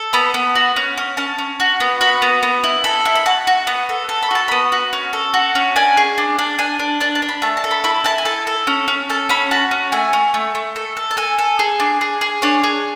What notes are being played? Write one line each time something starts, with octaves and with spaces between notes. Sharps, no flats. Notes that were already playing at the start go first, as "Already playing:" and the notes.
Already playing: A4
B3 B5
B3
F#4
C#4
C#4
C#4 A5
C#4
F#4
B3
F#4 B5
B3
B3
E4
A4 B5
E4
B5
F#4 A5
F#4
B3
A4
A4
B5
F#4 A5
B3 B5
F#4
C#4
A4
F#4
C#4
D4 G#5
G#4
D4
D4
D4 G#5
D4
D4 A5
A5
D4
B5
A3 A5
A5
A4
B5
E4 B5
E4 A5
G#5
A4 A5
A4
C#4
C#4
A4 A5
C#4 B5
F#4 A5
C#4
A3 G#5
C#4
A3
A3
A4
A4
A5
A4 G#5
A4
G#4
D4
G#4
G#4
D4 C#5
G#4